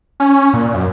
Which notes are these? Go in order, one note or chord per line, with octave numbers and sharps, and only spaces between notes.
C#4
A#2
F#2